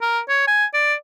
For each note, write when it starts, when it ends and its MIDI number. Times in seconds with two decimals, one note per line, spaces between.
0.01 0.20 70
0.29 0.45 73
0.47 0.65 80
0.74 0.94 74